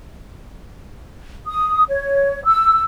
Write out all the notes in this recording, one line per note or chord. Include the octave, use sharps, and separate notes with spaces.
D#6
C#5
E6